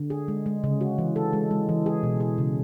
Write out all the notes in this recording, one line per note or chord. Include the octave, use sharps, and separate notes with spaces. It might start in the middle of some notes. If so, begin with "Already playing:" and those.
Already playing: D3
G#4
G#3
G#3
C#3
F#4
E3
A4
G#3
G#3
E3
G#4
B2
G#4
C#3